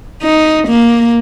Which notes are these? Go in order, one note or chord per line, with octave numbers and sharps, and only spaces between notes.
D#4
A#3